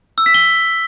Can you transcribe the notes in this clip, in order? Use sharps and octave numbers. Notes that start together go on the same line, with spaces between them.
E6
B6
G7